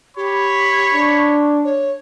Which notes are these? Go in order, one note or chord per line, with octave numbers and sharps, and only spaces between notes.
G4 C#5 B5
D4 C#6
C#5